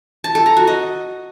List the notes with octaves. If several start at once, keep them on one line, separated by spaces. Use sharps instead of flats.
A5
A4
A#5
F#4
D#5